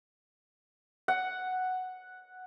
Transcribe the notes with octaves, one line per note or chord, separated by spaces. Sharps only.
F#5